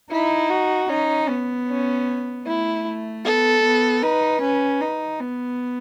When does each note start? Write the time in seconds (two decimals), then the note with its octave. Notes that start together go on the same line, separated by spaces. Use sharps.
0.11 D#4 E4
0.50 F#4
0.89 C#4 D#4
1.29 B3
1.68 C#4
2.46 A3 E4
3.25 B3 A4
3.64 B3
4.03 D#4 B4
4.42 C#4
4.82 D#4
5.20 B3